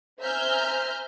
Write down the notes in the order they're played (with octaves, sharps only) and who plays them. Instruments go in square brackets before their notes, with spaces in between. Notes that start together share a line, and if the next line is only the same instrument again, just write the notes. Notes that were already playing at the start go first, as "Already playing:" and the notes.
[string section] C5 E5 G#5 A#5 F6 G6